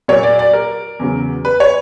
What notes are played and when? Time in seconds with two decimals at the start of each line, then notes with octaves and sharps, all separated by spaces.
0.08 A#2 F#3 A#3 C#5
0.23 D5
0.39 D5
0.53 A#4
0.99 E2 C#3 F#3
1.45 B4
1.60 C#5